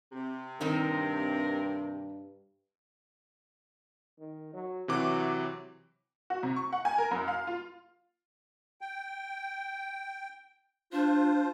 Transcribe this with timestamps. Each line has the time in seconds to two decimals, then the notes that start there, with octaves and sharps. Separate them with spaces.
0.12 C3
0.61 G2 D#3 C4 D#4 A#4
4.19 D#3
4.54 F#3
4.88 C3 E3 F#3 D6
6.30 F#4
6.43 C3
6.56 C#6
6.73 F#5
6.85 G#5
6.98 A#4
7.11 F#2
7.28 F5
7.47 F4
8.81 G5
10.92 D4 F4 C5